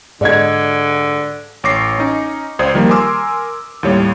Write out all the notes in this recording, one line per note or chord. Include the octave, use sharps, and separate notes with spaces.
G#2 D3 D5 D#5 G#6
A1 C#5 C#6 D6 A#6 C7
C#4 D#4
C#2 C5 D5 D#6 G#6
D#3 F3 G3 A#3
A#4 G#5 C6 D6 E6
D#2 A2 G3 C#5